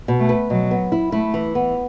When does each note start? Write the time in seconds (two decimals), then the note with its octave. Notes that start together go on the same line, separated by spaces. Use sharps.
0.08 B2
0.19 A3
0.29 B4
0.50 B2 F#3
0.71 B3
0.92 E4
1.12 A3 E4
1.34 E3
1.55 B3